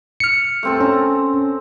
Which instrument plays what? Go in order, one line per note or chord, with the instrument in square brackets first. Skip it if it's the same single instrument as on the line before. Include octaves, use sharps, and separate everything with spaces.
[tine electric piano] F6 C#7
[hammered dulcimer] A3 C4 A4
[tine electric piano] C#4 [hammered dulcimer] A#5